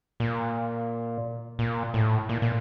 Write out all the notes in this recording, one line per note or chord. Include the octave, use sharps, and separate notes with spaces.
A#2
A#2
A2
A#2
A#2